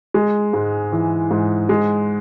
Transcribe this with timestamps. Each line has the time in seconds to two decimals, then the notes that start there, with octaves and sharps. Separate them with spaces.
0.14 G#3
0.53 G#2
0.92 E3
1.31 G#2
1.69 G#3